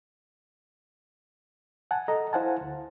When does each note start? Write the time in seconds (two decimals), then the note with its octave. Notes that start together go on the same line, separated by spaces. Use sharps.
1.91 F#5 G#5 A5
2.08 A4 D#5 A#5
2.33 E4 C5 F5 F#5 G#5 A5
2.61 D2